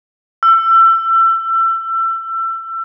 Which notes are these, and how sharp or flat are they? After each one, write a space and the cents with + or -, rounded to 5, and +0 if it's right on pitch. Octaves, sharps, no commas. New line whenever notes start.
E6 +30